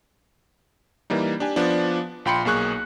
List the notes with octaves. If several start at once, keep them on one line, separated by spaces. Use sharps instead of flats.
E3 G3 A#3 D#4
D4 G4 G#5
F3 B3 D4
A#1 F4 G5 B5 C6 C#7
B1 A#3 G#4 C#6 F#6